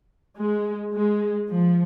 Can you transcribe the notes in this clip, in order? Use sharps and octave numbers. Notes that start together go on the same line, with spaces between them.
G#3
G#3
F3